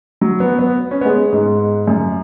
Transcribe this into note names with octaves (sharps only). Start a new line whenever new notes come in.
F#3
B3
B3
C#4
B3
G#3
G#2
F#2